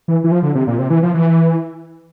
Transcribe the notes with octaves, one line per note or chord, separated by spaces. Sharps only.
E3
E3
F3
D3
C3
A#2
C3
E3
F3
E3